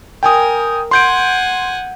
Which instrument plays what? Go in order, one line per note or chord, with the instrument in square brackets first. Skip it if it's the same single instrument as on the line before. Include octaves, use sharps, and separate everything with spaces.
[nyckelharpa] A#4 [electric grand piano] G5 G#5 D#6
[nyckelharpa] F#5 G#5 [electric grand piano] C6 G6 D7